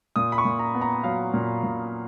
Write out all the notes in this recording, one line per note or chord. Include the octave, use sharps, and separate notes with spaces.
A#2 D#6
B5
C#6
A#2
A#5
B3
A#5
F#3 F5
A#2
A#2